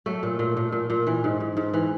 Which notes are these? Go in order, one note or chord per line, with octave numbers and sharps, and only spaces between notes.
F#3 A3
A#2
A#2
A#2
A#2
A#2
E3
G#2
G#2
G#2
E3